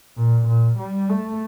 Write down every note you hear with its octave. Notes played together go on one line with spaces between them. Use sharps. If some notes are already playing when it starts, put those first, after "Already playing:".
A#2
A#2
G3
A3